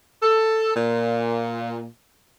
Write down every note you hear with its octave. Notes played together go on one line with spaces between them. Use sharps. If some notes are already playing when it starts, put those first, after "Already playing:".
A4
A#2